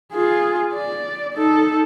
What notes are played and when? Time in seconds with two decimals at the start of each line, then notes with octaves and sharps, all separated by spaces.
0.14 F4 G#4
0.74 D5
1.34 D#4 A4